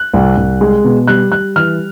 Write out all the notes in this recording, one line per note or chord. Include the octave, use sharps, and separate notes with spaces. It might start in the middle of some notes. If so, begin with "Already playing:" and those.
Already playing: F#6
C2
C2
G#3
B2
G3 F#6
G3 F#6
E3 F6